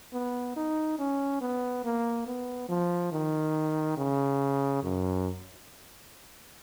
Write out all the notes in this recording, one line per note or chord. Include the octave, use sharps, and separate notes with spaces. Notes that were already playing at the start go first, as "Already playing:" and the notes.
B3
D#4
C#4
B3
A#3
B3
F3
D#3
C#3
F#2